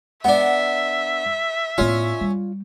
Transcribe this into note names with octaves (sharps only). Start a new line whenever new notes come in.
B3 D4 E5 F#5
A2 B3 C#4 F4 D5
G3